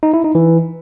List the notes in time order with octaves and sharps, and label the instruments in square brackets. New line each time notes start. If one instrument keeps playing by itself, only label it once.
[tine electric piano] D#4
E4
D#4
E3